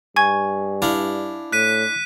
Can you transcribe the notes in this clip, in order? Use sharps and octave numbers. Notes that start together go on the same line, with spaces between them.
G2 G#5 C#6 G#6
D4 E4 F5
A2 F#6 B6 D#7